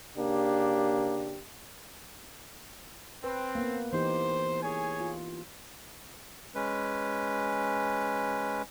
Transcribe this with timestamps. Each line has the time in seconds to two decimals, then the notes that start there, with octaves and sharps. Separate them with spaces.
0.18 C#3 A#3 D4 G4
3.24 C4 B4
3.55 A#3 B3
3.93 E3 D#4 G4 C5
4.62 G#4 C#5 G#5
5.00 F4
6.55 G#3 C#4 B4